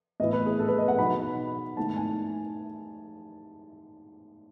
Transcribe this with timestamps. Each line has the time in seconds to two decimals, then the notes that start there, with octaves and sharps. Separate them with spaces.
0.20 A2 E3 B3 E4 D#5
0.33 B4
0.46 G#4
0.59 A4
0.68 B4
0.78 D#5
0.88 F#5
0.98 B2 F#3 B3 D#4 B5
1.77 G#2 D#3 A3 E4 A5
1.96 G#5